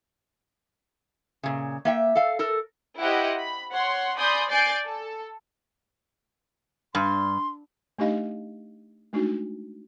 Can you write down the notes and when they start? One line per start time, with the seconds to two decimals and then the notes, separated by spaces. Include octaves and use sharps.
1.43 A#2 C#3
1.85 A#3 E5 G5
2.15 A4 F5
2.39 A4 A#4
2.99 E4 G4 C5 D#5 F#5
3.39 B5
3.74 C#5 F#5 C6
4.17 D5 G#5 B5 C6 D#6 G6
4.50 D5 G#5 G6 A6 C7 D7
4.84 A4
6.95 G2 C6
7.99 A3 D4 D#4 G4 D#5 F5
9.13 G#3 A3 D4 D#4 F#4